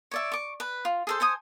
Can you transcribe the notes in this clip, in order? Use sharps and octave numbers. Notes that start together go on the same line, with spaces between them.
C#5 D5 E5
C#6 D6
B4
F4
G#4 A4 C5
A4 C5 G#5 D#6